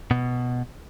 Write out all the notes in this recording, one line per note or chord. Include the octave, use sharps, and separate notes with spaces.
B2